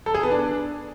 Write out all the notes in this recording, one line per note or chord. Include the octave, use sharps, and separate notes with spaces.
A4
G#4
B3
D4